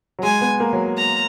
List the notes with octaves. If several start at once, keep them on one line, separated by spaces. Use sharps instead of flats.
F#3
G#3 G#5
B3
A#3
F#3
A#5